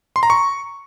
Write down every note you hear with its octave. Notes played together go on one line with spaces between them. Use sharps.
C6
A#5
C#6